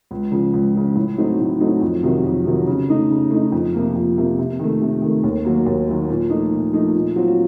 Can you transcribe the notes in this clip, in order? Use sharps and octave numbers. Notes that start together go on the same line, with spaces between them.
C#2
C#3 F3
C#2
C#3 F3
A2
F#3 A3 C4 D#4
A2
F#3 A3 C4 D#4
F2
C3 D#3 F#3
F2
C3 D#3 F#3
C#3
A3 D#4
C#3
A3 D#4
F2
C3 F3 A#3
F2
C3 F3 A#3
C3
D#3 A3
C3
D#3 A3
D#2
D#3 F#3 A#3
D#2
D#3 F#3 A#3
A#2
F3 A3 D#4
A#2
F3 A3 D#4
A#2
F#3 C4 F4